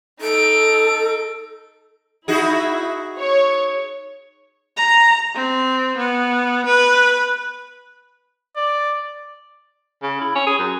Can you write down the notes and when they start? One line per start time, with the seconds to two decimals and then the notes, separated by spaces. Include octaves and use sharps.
0.21 D#4 A4 D7
2.28 D#4 E4 F#4 G#4
3.17 C#5
4.77 A#5
5.35 C4
5.97 B3
6.66 B4
8.56 D5
10.03 C#3
10.21 E4
10.35 C#4
10.47 G#4
10.59 F#2